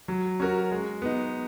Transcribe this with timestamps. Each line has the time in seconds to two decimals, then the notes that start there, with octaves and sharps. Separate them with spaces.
0.08 F#3
0.40 C#4 F#4 A#4
0.72 G#3
1.02 B3 D#4